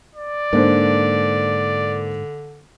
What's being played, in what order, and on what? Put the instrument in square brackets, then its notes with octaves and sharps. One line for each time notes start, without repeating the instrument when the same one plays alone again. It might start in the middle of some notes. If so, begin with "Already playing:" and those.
[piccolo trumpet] D5
[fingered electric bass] G#2 [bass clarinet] D3 [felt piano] A#3 D4 C5